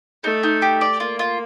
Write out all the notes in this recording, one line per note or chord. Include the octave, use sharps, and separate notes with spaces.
A3 D#4
D#4
G4
D5
A#3 F4
F4